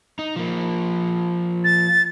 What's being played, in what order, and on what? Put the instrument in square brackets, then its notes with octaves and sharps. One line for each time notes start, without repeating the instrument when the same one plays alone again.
[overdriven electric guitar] D#4
F3 A#3
[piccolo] A6